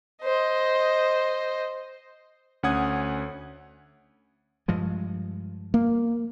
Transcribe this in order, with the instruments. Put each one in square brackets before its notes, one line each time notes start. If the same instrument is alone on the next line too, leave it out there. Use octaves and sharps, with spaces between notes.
[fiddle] C5 D#5
[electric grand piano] D2 C#4 F#5 D#6 G#6
[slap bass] G2 F3 G#3
[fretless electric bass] A#3